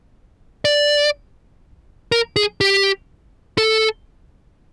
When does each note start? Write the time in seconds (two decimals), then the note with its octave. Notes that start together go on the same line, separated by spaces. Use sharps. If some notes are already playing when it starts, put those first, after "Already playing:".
0.65 D5
2.12 A#4
2.36 G#4
2.61 G4
3.58 A4